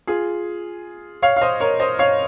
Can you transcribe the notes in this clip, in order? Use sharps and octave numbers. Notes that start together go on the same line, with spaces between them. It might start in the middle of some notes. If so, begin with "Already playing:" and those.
F4 G#4
C#5 F5
F5
C5 D#5
A#4 C#5
C5 D#5
C#5 F5